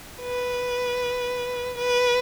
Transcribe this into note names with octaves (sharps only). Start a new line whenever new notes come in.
B4
B4